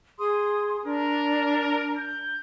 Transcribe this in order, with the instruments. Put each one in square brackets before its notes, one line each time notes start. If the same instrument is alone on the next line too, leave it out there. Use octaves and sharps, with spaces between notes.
[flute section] G#4 C6 D#6
[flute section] D4 [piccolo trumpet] A#4
[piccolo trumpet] G6